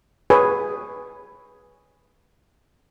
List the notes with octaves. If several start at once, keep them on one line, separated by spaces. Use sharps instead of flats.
G#4 B4 C#5 G#5